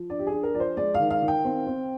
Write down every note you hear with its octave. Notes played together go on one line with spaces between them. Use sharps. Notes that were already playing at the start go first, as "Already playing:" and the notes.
Already playing: F3
D4 D5
G4
G#4
D4
A#4
F3 D5
C5
G#3 D5
D#3 F5
F5
D#3
G5
C4
C4